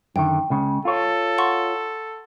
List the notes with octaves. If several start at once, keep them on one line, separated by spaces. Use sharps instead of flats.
F#2 D3 D#3 G5
C#2 C#3
F4 A4 C#5
F#5 C6 C#6